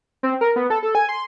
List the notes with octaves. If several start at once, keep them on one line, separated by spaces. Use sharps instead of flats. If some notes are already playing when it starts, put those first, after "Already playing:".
C4
A#4
B3
A4
A4
G#5
C6